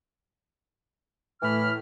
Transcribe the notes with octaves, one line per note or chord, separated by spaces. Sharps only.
A2 E3 B5 F6